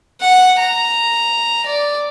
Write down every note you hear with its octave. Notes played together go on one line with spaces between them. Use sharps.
F#5
A#5
D5